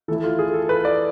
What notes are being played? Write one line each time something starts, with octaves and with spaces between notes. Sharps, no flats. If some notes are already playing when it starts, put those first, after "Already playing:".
E3 A3 E4 A4
F4
G#4
A4
B4
D5